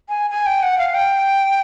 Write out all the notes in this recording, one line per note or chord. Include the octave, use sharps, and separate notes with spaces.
G#5
G#5
G5
F#5
F5
G5